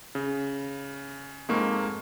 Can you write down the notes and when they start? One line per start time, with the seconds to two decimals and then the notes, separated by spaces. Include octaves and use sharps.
0.15 C#3
1.48 F2 G#2 A#3 C#6